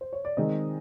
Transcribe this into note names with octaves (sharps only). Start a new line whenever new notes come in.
C5
C#5
D5
D#3 G#3 C4 D#5